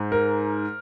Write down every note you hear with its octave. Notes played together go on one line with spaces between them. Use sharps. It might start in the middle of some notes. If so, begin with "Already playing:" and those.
Already playing: G#2
A#4